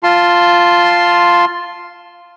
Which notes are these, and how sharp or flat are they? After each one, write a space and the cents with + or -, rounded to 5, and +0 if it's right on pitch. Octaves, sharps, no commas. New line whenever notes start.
F4 +0 A5 +0 C6 +0